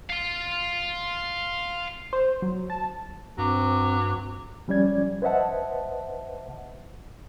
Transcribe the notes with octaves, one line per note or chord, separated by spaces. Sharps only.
F5 C6
C5
F#3
A5
G2 F#3 C4 D6
F3 G3 C#4 D5 G#6
B4 C5 D#5 E5 F#5 A5